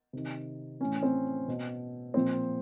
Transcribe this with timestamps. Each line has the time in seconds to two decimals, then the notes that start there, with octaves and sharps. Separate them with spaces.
0.13 C3 D#3
0.80 A2 E3 C#4
1.03 C4
1.48 B2
2.14 A#2 F3 C4